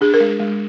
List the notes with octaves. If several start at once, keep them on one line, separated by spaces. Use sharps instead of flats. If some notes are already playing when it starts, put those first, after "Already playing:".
D4 G#4
A#4
G#3
G#3